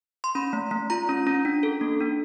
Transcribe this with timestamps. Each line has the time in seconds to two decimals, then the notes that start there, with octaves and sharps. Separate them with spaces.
0.24 C6
0.35 C#4 B5
0.53 A3
0.71 A3
0.90 F4 A#5
1.09 C#4
1.27 C#4
1.45 D4
1.63 A4
1.81 A#3
2.00 D4